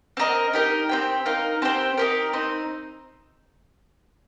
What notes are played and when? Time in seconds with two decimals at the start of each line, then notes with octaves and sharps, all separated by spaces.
0.17 C4 F4 A#4 D#5
0.53 D#4 G4 A#4
0.89 C4 G4 C5 G5
1.26 D#4 A#4 F5
1.62 C4 G4 C5 G5
1.97 D#4 G4 A#4
2.33 C4 D#4